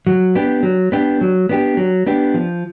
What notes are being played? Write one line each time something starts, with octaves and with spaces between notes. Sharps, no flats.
F#3
B3 D4 G4
F#3
B3 D4 G4
F#3
B3 D4 G4
F#3
B3 D4 G4
F3